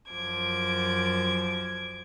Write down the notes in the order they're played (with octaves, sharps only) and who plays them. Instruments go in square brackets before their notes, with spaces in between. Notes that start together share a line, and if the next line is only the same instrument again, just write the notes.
[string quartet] F#2 F3 D6 G#6